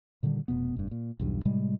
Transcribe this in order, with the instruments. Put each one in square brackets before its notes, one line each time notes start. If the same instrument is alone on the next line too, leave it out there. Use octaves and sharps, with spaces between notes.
[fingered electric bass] A#2 D3 D#3 G3
F1 E2 B2 B3
F1 G2
A#2
B1 E2 G2
A2 C3 G3 G#3